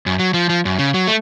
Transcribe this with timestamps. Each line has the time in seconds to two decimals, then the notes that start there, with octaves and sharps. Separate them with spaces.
0.06 F#2
0.19 F#3
0.34 F3
0.49 F3
0.65 F#2
0.79 C#3
0.94 F#3
1.07 A3